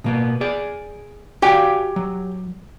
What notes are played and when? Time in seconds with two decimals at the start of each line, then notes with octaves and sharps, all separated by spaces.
0.04 B2 A#3 B3
0.41 G#4 D5
1.42 F#4 G4 D5 F5 G5 G#5
1.96 F#3